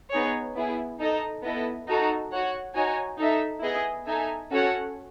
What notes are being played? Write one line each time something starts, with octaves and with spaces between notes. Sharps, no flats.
B3 D#4 G#4 C#5
B3 E4 G#4
D#4 A4 D#5
B3 E4 A4 D#5
D#4 F#4 A4
F#4 C#5 F#5
D#4 F#4 C#5 G#5
D#4 A4 E5
B3 E4 G#4 D#5
D#4 A4 E5 G#5
C#4 F#4 A4 C#5 F#5